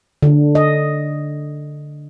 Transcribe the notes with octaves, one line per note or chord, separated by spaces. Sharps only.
D3
D#5